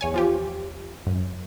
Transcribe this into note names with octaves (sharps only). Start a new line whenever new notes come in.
E2 C#5 G#5
F3 F4 G4
F#2